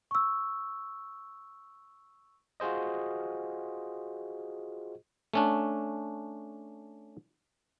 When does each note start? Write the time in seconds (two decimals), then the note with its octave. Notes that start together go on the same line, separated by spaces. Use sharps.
0.11 C#6 E6
2.60 F4 F#4 G#4 C5 D#5
5.34 A3 C#4 D4